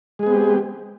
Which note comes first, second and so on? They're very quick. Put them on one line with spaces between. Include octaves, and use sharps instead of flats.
G#3 G#4 B3 C4 G4